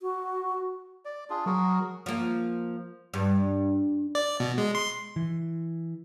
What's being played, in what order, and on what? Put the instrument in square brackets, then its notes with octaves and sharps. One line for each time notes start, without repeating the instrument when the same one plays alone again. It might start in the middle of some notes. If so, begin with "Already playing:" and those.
[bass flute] F#4
[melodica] D5
D4 F4 G#4
[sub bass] F#3 [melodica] F#4 G#4 A#4
[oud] F3 A#3
G2
[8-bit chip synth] D5
B2
G#3
C6
[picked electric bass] E3